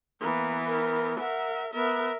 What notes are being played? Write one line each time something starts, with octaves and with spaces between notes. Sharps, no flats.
E3 A#3 B3
A#4
A#4 E5 F#5
B3 A#4 E5